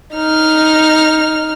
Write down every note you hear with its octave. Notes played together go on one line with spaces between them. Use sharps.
D#4 F6